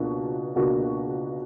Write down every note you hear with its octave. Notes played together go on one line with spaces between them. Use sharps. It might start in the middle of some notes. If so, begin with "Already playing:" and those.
Already playing: C#2 B2 A#3 D4 F#4
C#2 B2 A#3 D4 F#4